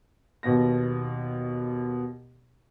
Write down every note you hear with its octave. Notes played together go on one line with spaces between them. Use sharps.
D#2 B2 B3 A#6